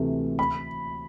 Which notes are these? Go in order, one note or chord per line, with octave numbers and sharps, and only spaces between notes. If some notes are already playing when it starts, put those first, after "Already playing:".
Already playing: D2 C3 E3 A3
B5